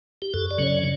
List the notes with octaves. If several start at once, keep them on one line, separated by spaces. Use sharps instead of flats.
G4
F#2 A4
D5
C#3 F#3 C#4 C#5
D5